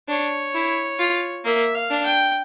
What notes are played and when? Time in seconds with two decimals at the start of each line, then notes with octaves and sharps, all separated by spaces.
0.08 D4 C#5
0.55 E4
1.00 F4
1.45 A#3 E5
1.75 F5
1.90 D4
2.05 G5